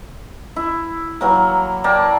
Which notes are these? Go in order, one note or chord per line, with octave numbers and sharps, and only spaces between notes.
E4
E3 F#3 A#3
A#3 D5 G5 A5